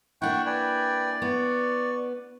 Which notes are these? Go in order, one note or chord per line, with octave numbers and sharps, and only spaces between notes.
A#3 D4 E4 F#5 G5 C#6
B4 D5 G5 G#5
B3 C#6